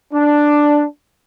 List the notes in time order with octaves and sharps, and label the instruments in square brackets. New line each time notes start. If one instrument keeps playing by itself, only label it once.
[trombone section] D4